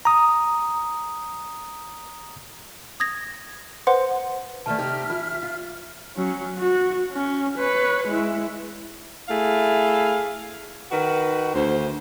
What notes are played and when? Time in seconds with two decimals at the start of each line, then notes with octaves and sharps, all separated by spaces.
0.05 A#5 D#6
3.00 D#6 G#6 A#6
3.87 B4 C5 F#5 C6
4.66 D#3 E3 A3 D5 E5 A5 F6
4.79 C3 D#4 G4
5.10 E3 F4
5.43 F4
6.16 F#3 C#4
6.59 F#4
7.13 C#4
7.58 B4 C#5
8.07 G#3 E4
9.29 A3 E4 G#4 F5
10.92 D#3 F#4 B4
11.54 D2 C5